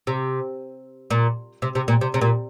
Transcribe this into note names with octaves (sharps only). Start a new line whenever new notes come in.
C3
A#2
C3
C3
A#2
C3
C3
A#2